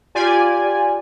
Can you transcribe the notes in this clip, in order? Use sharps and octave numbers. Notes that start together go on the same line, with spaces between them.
F4 G4 D5 G#5